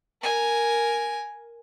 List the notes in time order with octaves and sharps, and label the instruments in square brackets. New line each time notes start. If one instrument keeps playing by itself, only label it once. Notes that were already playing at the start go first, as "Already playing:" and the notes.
[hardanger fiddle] A#4 G#5